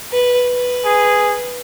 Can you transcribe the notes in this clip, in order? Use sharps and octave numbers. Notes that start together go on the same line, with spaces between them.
B4
B4
G#4